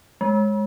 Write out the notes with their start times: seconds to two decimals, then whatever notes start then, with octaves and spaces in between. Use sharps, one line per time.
0.21 G#3